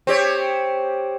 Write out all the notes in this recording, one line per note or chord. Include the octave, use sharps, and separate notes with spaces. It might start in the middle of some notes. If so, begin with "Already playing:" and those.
C4 G4 C#5